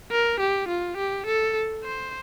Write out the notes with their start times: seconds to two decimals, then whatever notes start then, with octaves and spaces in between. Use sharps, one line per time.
0.11 A#4
0.40 G4
0.68 F4
0.97 G4
1.26 A4
1.84 C5